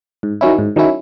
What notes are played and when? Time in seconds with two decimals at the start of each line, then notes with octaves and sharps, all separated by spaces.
0.23 G#2
0.41 D#3 F#3 C#4 E4
0.58 G#2
0.76 D#3 F#3 C#4 E4